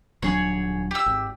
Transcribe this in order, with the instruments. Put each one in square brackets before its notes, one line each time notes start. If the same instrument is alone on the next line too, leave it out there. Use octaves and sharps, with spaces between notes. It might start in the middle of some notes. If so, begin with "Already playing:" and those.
[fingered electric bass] D#1 F#3 D4 [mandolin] G#4 C#5
[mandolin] G4 E6
[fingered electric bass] G#1